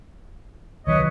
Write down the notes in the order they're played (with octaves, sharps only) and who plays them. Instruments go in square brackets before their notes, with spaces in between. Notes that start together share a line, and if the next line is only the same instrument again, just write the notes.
[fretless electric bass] C2 D#3 F#3 [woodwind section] B4 C#5 D#5